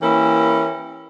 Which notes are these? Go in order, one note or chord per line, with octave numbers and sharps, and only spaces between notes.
E3 A#3 C#4 E4 G4 A#4